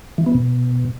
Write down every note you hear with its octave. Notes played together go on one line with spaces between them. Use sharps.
E3
B3
B2